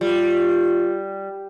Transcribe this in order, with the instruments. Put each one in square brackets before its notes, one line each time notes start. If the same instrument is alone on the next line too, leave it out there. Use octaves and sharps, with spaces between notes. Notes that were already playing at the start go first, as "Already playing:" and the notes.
[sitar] G3 [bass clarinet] F4